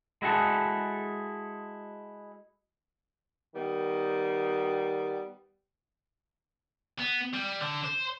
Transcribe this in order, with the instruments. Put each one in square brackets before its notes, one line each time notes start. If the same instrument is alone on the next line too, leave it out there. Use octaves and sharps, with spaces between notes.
[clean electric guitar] G#3 E4 F#4 G#4 A4
[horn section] D#3 G3 B3
[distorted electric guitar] B3
G3
D3
C5